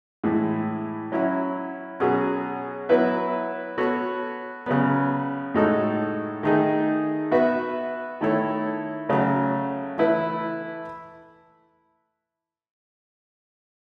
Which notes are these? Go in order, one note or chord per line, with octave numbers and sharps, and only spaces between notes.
A2 E3 G#3
F#3 C#4 E4
B2 F#3 C#4 G#4
F#3 B3 E4 B4 E5
B3 F#4 A4 C#5
C#3 F#3 B3
A2 G#3 D#4 F#4 A4
D#3 A3 D#4 G#4
B3 F#4 B4 E5
D#3 A3 E4 A4 C#5
C#3 F#3 A3
E3 A3 E4 B4